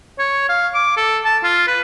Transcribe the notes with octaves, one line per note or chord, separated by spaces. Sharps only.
C#5
F5
D6
A4
A5
F4
B4